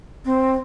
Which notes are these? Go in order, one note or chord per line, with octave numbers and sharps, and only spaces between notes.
C4